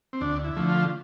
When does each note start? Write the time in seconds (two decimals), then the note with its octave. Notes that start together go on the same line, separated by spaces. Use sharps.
0.13 C4
0.21 D2 D4
0.44 E4
0.57 D3 F3 A3
0.69 F4